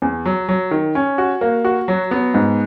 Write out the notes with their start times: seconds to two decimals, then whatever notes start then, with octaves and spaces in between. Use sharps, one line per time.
0.02 E2
0.26 F#3
0.49 F#3
0.71 D#3
0.95 C#4
1.18 F#4
1.41 A#3
1.65 F#4
1.88 F#3
2.11 B3
2.34 G#2